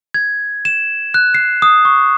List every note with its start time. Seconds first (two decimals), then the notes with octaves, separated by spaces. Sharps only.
0.14 G#6
0.65 E7
1.14 F#6
1.35 C7
1.62 D#6
1.85 C#6